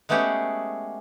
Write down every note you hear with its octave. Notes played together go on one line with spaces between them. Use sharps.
G#3 A3 B3 C#4 G4 G#4